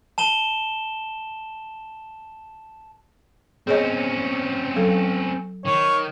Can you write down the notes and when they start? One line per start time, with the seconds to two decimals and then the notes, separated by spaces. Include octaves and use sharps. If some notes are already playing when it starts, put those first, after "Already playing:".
0.18 A5 E7 G7
3.67 C4 C#4 G#4 C#5 D#5
4.76 F#3 A4
5.65 D#3 C#5